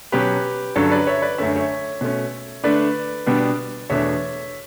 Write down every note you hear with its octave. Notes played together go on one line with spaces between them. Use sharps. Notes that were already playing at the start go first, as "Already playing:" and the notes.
B2 F#3 C#4 G4 B4
G2 D3 F#3 C#4 A4 C#5
B4 D5
C#5 E5
B4 D5
F#2 D3 A3 C#4 E5
C#5 E5
B2 A3 C#4
D3 A3 D4 B4 D5
B2 G3 B3 D4
E2 B2 A3 D4 C#5 E5